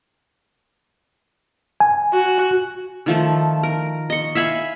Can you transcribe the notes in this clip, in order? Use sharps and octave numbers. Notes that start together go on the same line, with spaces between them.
G#5
F#4
D#3 F3 A3
A#4
D#5 C#6
E5 F5 G#5 B5